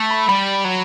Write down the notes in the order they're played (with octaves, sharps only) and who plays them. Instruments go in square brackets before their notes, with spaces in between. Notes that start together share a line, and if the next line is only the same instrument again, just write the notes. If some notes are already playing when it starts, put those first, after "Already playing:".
Already playing: [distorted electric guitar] A3
[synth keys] B5
[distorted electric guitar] G3 [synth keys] B5
[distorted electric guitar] F#3